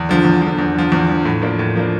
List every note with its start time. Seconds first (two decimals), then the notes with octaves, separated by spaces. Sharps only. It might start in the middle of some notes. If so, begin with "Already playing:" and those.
Already playing: E2
0.09 D3 F3
0.24 E2
0.42 D3 F3
0.59 E2
0.75 D3 F3
0.92 E2
1.08 D3 F3
1.25 A2
1.42 F3 A#3 D4
1.59 A2
1.76 F3 A#3 D4